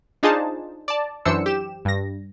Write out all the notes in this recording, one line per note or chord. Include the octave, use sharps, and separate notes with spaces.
D4 D#4 F4 G#4 C5 A5
D5 A5
F#2 E3 D4 C5 E6 C#7
G4 E7
G2 A#6